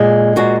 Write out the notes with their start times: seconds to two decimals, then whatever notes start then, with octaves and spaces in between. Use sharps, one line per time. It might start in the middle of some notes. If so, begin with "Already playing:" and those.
Already playing: A#2 G#3 G#4
0.36 A#2 G#3 F#4